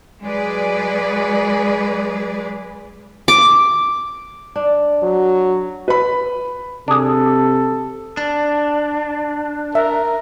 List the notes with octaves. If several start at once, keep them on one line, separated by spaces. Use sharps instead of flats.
F#3 G#3 G#4 B4 D5
D6
D4
F#3
B4 B5
C3 D4 G#4 A4
D4
A#4 E5